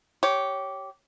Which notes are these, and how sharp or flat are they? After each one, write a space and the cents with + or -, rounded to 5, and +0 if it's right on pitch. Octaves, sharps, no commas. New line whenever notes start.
G4 -15 C#5 +0